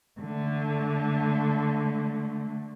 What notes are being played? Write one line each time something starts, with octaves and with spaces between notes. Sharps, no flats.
D3 A3